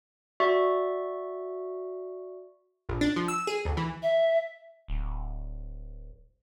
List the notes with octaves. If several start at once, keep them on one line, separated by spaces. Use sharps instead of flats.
F#4 D5 E5 C#6
A#1
D4
F3
E6
G#4
D2
E3
E5
D1